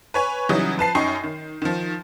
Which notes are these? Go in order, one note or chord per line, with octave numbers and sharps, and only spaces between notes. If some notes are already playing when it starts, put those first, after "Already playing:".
B4 C#5 G#5
C#3 E3 F#3 G3 D#4 D#6
F3 B4 A5 C7
F#2 D#4 G5 C#6 C7
D#3
D#3 F3